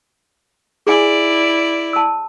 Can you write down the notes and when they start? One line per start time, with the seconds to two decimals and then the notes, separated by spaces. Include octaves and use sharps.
0.87 E4 G#4 D5 G#5
1.93 A5 E6